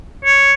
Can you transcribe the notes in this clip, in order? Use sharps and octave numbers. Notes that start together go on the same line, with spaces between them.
C#5